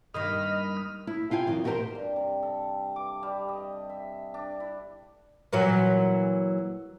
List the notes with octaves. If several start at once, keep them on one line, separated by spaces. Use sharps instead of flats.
G2 D#3 A#3 D#5 B5 D#6 F6
E4
F4 F5 G5 G#5
F2 D#3
D#4 F#4 G4 A4 A#4 C5
G2
C3
A4
D6
G3
D#5
E5
D4
E4
A#2 E3 F#3